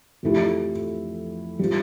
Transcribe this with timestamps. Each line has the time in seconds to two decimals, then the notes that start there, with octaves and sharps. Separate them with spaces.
0.23 F2 E3 A3 E4 G4
1.59 G3 C4 F4